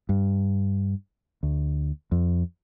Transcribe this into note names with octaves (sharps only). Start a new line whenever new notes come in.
G2
D2
F2